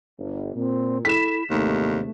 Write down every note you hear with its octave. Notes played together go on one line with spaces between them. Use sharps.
G1
A#2 C4
E4 A4 B6 E7
G1 D#2 G#2 C3 A3